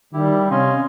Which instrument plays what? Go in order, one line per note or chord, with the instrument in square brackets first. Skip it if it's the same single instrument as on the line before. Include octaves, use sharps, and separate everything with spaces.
[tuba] D#3 [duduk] G3 [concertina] E4 G4
[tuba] C3 [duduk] C#4 [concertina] D#5 F5 G#5 [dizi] C6